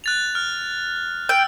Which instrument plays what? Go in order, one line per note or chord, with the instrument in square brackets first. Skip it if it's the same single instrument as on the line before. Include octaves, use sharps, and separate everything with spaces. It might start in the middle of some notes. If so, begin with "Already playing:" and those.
[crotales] F#6 A6 F7
F6
[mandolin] G5 [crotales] E6